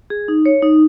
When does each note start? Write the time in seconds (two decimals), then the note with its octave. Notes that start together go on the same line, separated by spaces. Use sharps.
0.10 G#4
0.28 D#4
0.46 C#5
0.62 D#4